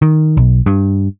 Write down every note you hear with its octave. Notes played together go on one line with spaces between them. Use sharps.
D#3
B1
G2